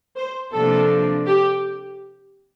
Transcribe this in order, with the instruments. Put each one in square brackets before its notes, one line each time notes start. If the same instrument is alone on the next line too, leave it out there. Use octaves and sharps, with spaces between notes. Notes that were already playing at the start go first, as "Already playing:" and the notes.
[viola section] C5
[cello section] C3 F3 A#3 D4 [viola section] A4
[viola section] G4